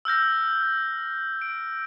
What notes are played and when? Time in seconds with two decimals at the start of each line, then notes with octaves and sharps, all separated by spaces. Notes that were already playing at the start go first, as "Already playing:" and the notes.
0.05 E6 F6 G6 A#6
1.42 D7